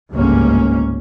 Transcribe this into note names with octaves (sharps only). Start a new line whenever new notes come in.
G1 C#2 G#2 A#3 C#4